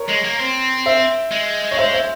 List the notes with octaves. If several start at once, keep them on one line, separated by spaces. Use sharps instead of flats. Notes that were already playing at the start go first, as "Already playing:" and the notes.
Already playing: A#4 C#5
G#3
A#3
C4
C5 E5
G#3
C#5
C5 E5
C5 E5